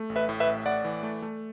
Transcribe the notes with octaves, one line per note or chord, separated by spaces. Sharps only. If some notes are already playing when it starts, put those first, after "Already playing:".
Already playing: A3
A1
B4 E5
A2
B4 E5
A1
A2 D5 F#5
E3
A3
A3